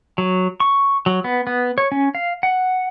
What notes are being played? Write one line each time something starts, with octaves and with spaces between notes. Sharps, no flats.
F#3
C#6
F#3
B3
B3
C#5
C#4
F5
F#5